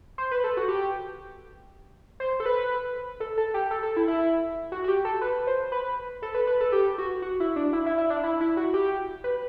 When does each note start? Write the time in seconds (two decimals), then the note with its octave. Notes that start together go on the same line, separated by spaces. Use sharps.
0.18 C5
0.31 B4
0.44 A4
0.57 F#4
0.68 G4
2.20 C5
2.40 A4
2.46 B4
3.20 A4
3.38 A4
3.54 G4
3.71 A4
3.83 A4
3.97 E4
4.08 E4
4.72 F#4
4.84 F#4
4.88 G4
5.05 A4
5.21 B4
5.47 C5
5.72 B4
6.22 A4
6.35 B4
6.47 B4
6.61 A4
6.72 G4
6.98 F#4
7.22 F#4
7.40 E4
7.56 D4
7.73 E4
7.86 E4
7.98 E4
8.10 D4
8.24 E4
8.41 E4
8.57 F#4
8.74 G4
9.24 B4